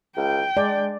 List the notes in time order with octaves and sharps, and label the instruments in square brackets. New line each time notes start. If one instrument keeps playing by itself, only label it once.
[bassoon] C#2 [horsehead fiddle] G5
[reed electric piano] G#3 [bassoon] D4 [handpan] D5